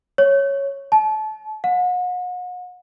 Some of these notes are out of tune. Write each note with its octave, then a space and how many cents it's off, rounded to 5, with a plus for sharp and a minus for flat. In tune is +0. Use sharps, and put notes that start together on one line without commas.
C#5 -5
A5 -30
F#5 -40